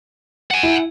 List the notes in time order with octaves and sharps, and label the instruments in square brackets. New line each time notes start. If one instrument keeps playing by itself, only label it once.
[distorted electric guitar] F#5 G#5
[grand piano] E4